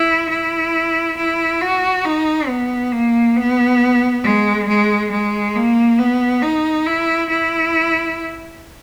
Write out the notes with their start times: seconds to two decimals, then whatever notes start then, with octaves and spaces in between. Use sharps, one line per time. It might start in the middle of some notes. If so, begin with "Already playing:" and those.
Already playing: E4
0.30 E4
1.17 E4
1.61 F#4
2.05 D#4
2.49 B3
2.92 A#3
3.37 B3
4.23 G#3
4.68 G#3
5.12 G#3
5.55 A#3
5.99 B3
6.42 D#4
6.87 E4
7.30 E4